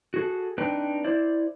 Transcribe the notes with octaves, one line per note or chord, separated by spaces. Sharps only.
F#4 G#4 A4
C4 D4 D#4 B4 G5
E4 C5 D5